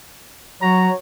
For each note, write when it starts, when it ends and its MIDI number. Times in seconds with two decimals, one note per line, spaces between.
0.62 0.89 54
0.62 0.93 66
0.62 0.97 73
0.62 0.93 82